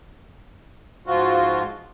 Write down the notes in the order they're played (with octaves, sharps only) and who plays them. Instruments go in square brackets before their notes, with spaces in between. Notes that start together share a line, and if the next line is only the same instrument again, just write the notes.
[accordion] G#2 F3 F4 F#4